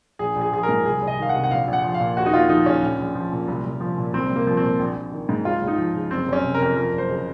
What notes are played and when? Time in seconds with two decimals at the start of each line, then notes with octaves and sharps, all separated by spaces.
0.19 A#1 G#4
0.36 A#1
0.41 G#4
0.52 F3 G#4
0.63 A#4
0.69 G#2
0.85 C2 G#4
1.02 C2
1.07 D#5
1.18 D#3 F5
1.29 F#5
1.35 C3
1.44 F#5
1.51 A#1 F5
1.68 A#1
1.73 F#5
1.84 F3
1.94 F5
2.00 A#2
2.17 D#2 F#4
2.26 D#4
2.33 D#2 F4
2.49 F3 D#4
2.66 C#3 C#4
2.82 A#1
2.99 A#1
3.15 F3
3.32 A#2
3.48 C2
3.64 C2
3.80 F3
3.97 A#2
4.13 C2 C4
4.30 C2
4.36 A#3
4.47 F3
4.57 C4
4.63 A#2
4.79 A#1
4.96 A#1
5.12 D#3
5.29 G#2
5.45 C#2 F4
5.62 C#2
5.67 D#4
5.78 F3
5.95 C#3
6.10 F#1 C4
6.28 F#1
6.33 C#4
6.44 C3
6.54 A#4
6.61 F2
6.76 F3 A#4
6.93 F#1
6.98 C5
7.09 C#3